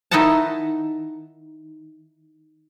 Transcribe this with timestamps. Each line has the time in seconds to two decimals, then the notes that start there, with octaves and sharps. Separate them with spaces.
0.11 D#3 D#4 E4 D#5 F#5 A5